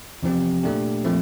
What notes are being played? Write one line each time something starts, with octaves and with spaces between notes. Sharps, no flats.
E2 C3 F3 C4 G4
A#2 A3 D4 G4
A#2 F3 A3 C4